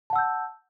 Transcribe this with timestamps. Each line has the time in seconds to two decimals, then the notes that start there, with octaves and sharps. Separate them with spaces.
0.10 A5
0.13 F#5
0.16 E6
0.18 G6